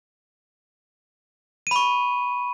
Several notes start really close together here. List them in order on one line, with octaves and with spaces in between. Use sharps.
D#7 B5 C#6